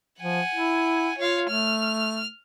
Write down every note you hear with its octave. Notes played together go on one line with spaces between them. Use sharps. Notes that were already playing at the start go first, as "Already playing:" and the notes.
F3 F#5 G#5
E4
F4 C#5 F5
A3 F6